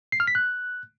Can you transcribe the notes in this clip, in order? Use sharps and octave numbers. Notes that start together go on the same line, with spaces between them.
C7
F6
B6
F#6